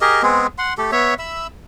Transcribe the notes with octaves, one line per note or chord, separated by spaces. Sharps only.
G4 G#4 A#4 D#5
G#3 B3 C4 G#4
F#5 C6
A3 G4 A4
B3 C#5 E5
E5 B5 E6